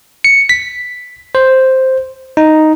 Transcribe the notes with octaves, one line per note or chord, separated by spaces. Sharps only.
C#7
B6
C5
D#4